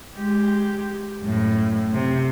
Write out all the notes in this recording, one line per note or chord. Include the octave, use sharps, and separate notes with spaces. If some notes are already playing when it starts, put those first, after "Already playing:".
G#3 G4
F#2 A2
C3